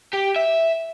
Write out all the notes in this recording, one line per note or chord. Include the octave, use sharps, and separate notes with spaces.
G4
E5